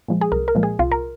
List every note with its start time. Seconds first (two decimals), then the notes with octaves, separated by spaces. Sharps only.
0.08 A#2 F3 G#3
0.21 G#4
0.32 C2 A#4
0.48 A#4
0.55 A#2 F3 G#3
0.63 G#4
0.79 C2 F4
0.92 A#4